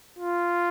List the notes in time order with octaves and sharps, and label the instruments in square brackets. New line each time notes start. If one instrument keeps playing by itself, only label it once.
[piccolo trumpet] F4